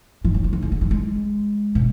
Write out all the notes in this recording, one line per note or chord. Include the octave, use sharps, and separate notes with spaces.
F3
F#3
F3
D3
C#3
D3
F3
G#3
B2